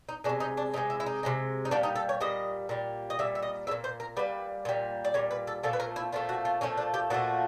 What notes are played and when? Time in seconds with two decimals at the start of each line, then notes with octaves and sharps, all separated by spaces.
0.09 D#4
0.24 E3 G#3 D4
0.29 C3
0.40 D#4
0.57 D4
0.74 C3 E3 G#3 D#4
0.90 E4
1.00 E4
1.06 D#4
1.23 C3 E3 G#3
1.65 D#4
1.71 A#2 G3 D4
1.83 D#4
1.96 A4
2.09 C#5
2.21 A#2 G3 D#5
2.69 A#2 G3
3.10 D#5
3.19 A#2 G3 E5
3.35 E5
3.43 D#5
3.67 G3 E5
3.71 A#2
3.84 C5
4.00 A#4
4.17 A#2 G3 B4
4.65 A#2 G3
5.05 D5
5.14 A#2 G3 C#5
5.31 B4
5.47 A4
5.63 A#2 F3 A3 A4
5.73 B4
5.80 A#4
5.96 E4
6.12 A#2 F3 A3 F4
6.29 F#4
6.45 F4
6.61 A#2 F3 A3 C#4
6.77 D4
6.94 G4
7.10 A#2 F3 A3 F#4